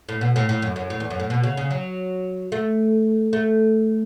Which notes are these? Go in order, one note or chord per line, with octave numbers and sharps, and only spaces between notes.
A2
B2
A2
A2
F#2
F#2
A2
E2
F#2
A2
B2
C#3
C#3
F#3
A3
A3